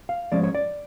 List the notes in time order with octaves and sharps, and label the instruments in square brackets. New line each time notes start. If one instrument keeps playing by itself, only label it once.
[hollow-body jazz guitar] F5
F3 G#3 C#4 D5
C#5
D5